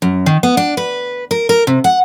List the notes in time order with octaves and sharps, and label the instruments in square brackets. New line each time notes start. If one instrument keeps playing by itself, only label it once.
[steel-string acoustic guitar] F#2
D#3
B3
D4
B4
A#4
A#4
C3
F#5